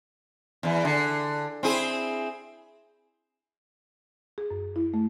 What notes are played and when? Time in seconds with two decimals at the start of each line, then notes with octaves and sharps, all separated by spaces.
0.63 E2 E3
0.85 D3
1.63 C4 E4 G#4
4.38 G#4
4.50 F#2
4.76 E4
4.94 A3